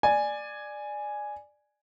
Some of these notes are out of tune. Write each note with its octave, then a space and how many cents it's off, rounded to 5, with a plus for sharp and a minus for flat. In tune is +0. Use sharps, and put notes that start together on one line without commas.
D5 +15 G#5 +0